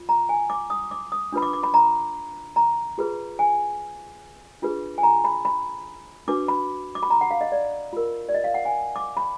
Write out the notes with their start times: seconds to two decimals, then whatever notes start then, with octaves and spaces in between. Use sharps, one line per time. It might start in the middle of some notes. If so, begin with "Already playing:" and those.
Already playing: F4
0.09 A#5
0.29 G#5
0.50 D6
0.70 D#6
0.91 D6
1.12 D#6
1.32 D4 F4 B4 B5
1.42 D6
1.53 D6
1.63 B5
1.74 A#5
2.56 A#5
2.98 F4 G#4 B4
3.39 G#5
4.62 D4 F4 G#4 B4
4.98 G#5
5.03 A#5
5.24 B5
5.45 B5
6.28 D4 F#4 B4 D6
6.48 B5
6.95 D6
7.03 B5
7.10 A#5
7.21 F#5
7.31 F5
7.41 D#5
7.52 D5
7.93 F4 A#4
8.29 D5
8.34 D#5
8.44 F5
8.54 F#5
8.65 G#5
8.96 D6
9.17 B5